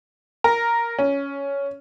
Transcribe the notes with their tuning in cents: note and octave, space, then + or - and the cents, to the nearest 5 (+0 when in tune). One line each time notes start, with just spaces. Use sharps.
A#4 +0
C#4 +10